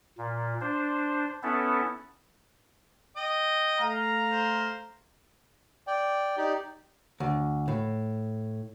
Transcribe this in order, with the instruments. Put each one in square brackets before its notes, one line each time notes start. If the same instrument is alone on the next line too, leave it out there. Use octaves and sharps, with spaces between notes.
[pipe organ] A#2
D4 C5
B3 C#4 E4 A4
[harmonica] D#5 G5
[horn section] A3 F5 A#5
[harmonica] C5
[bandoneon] D5 G5
D#4 G4 D5
[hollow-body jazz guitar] D2
A2